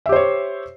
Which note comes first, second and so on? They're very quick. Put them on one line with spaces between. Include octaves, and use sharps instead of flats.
E5 G4 C5 C#5